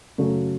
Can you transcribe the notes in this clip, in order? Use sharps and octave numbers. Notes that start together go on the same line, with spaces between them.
F#2 C#3 F#3 A3